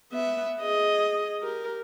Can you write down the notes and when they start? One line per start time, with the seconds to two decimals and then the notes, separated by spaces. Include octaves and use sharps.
0.12 B3 E5
0.60 G#4 D#5
1.41 G4 A#4